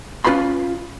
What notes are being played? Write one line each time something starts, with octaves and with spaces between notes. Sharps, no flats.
C#4 F4 B4 B5 C6